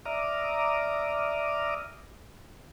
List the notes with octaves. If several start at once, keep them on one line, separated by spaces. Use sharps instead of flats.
D5 E5 A#5 D6 D#6 F6